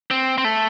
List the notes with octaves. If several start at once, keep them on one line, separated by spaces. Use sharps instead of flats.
C4
C4
A3